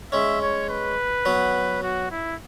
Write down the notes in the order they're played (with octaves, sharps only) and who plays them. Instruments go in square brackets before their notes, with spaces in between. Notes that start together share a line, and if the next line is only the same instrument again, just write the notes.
[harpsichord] G#3 C#4 [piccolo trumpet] E5
[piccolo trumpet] C#5
B4
[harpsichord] F#3 B3
[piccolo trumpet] F#4
E4